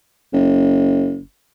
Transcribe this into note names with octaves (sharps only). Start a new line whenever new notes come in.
F#1